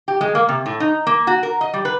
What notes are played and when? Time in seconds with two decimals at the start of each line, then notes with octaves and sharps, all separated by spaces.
0.08 G4
0.21 G#3
0.35 A#3
0.49 C3
0.66 A2
0.80 D#4
1.07 A#3
1.27 F#4
1.43 A#4
1.61 D#5
1.73 G3
1.85 B4